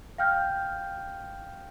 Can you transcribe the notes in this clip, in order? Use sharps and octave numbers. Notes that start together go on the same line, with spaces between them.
F5 G5 F6 G6